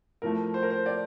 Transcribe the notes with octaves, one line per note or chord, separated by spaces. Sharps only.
A2 F3 A3 A#4
C5
A#4
C5
D5